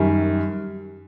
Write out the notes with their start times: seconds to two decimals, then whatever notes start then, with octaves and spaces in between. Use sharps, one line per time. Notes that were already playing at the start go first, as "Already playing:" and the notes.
Already playing: F#2 D#3 G3